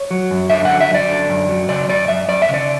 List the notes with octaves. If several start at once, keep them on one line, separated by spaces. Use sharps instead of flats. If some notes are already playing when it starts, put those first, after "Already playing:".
Already playing: C#5
F#3
F#2
D3 E5
F#5
F#3
E5
F#2 D5
D3
F#2
F#3
C#3 D5
F#2 D5
F#2 E5
F#2 D5
E5
C#3
D5